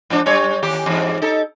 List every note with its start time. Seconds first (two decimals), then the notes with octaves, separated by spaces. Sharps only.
0.10 G#2 F3 D4
0.26 F#2 G3 C#5
0.63 D#2 G4
0.86 E2 G#2
1.22 D#4 A4